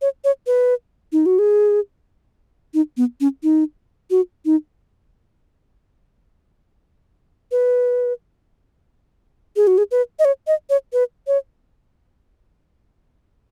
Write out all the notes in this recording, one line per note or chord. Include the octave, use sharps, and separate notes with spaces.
C#5
C#5
B4
D#4
F#4
G#4
D#4
B3
C#4
D#4
F#4
D#4
B4
G#4
F#4
G#4
B4
D#5
C#5
D#5
C#5
B4
C#5